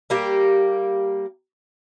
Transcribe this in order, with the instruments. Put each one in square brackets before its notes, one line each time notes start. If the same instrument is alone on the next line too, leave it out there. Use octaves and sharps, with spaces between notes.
[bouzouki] G3 A#3 G4